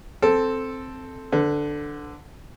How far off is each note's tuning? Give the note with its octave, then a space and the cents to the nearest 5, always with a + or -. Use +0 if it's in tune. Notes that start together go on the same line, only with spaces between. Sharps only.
C4 +0 A4 +0
D3 +0 B4 +35